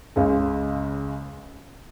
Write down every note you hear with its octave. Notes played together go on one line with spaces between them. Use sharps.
C#2 C#3 G#3